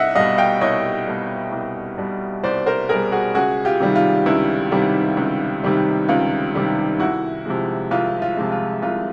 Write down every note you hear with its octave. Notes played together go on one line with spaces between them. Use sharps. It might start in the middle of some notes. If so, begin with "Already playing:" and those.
Already playing: C2 D#5 E5 F#5
B2 G3 D#5 F5
F5 G5
C2 C#5 D#5
B2 G3
C2
B2 G3
C2 C5 D5
A#4 C5
B2 G3 G#4 A#4
F#4 G#4
C#2 F#4 G#4
F4 G4
C3 D#3 G3
F4
C#2 E4
C3 D#3 G3
C#2
C3 D#3 G3
C#2 F4
C3 D#3 G3
C2 E4 F#4
C3 F3 G#3
C2 F4
F4
C3 F3 G#3
F4
C2 F4